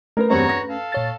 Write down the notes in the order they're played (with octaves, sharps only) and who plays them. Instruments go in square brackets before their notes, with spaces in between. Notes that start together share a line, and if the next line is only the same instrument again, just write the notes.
[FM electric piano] A3 C#4 B4 [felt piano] A#4
[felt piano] E2 G2 C4 [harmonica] F#4 C#5 A#5
[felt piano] A#6
[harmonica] A4 F5
[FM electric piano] A#2 C#5 A6